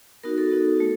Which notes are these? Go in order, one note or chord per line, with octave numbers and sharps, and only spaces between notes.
B3 D#4 F#4 A#4
A4
B3 D#4 F#4
A3